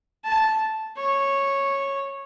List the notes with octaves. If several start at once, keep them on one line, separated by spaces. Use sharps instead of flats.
A5
C#5